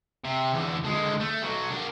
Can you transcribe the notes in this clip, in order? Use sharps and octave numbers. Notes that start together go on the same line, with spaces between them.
C3
E2 D3
D3 G#3
A3
B1 F#3
D4 A#4